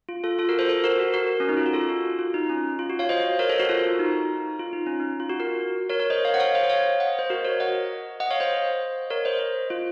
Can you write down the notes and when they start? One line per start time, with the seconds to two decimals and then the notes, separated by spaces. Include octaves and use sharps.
0.09 F4
0.24 F4 A4
0.39 F4 A4
0.49 F#4 A#4
0.59 A4 C5
0.69 A4 C5
0.84 F#4 A#4
0.99 F#4 A#4
1.14 F#4 A#4
1.40 C#4
1.49 D#4
1.57 F4
1.66 F#4
1.73 F4 A4
1.89 F#4
2.19 F4
2.34 D#4
2.49 C#4
2.79 F4
2.90 F#4
2.99 C#5 F5
3.09 C5 D#5
3.39 A#4 C#5
3.49 A4 C5
3.59 F#4 A#4
3.69 F4 A4
3.84 F#4
3.99 D#4
4.60 F4
4.73 D#4
4.86 C#4
5.00 D#4
5.20 F4
5.30 F#4
5.40 F#4 A#4
5.90 A#4 C#5
6.00 A#4 C#5
6.10 C5 D#5
6.25 C#5 F5
6.34 F#5
6.40 C#5 F5
6.55 C5 D#5
6.70 C#5 F5
7.00 D#5 F#5
7.19 C5
7.30 F#4 A#4
7.45 A#4 C#5
7.60 D#5 F#5
8.20 D#5 F#5
8.30 C#5 F5
8.40 C5 D#5
9.10 A#4 C#5
9.25 C5 D#5
9.70 F4